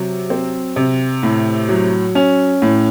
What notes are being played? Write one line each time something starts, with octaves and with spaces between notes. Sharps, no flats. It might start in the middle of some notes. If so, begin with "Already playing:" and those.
Already playing: C3 F#3
C4
C3
A2
F#3
C#4
A2